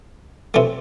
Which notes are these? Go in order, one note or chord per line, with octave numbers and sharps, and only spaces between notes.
C3 E3 A3